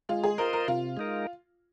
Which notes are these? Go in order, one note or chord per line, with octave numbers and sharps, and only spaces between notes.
G#3 F4
G#4
F4 A#4 C5 D#5
A#4
C3 F4
G#3 D#4 A#4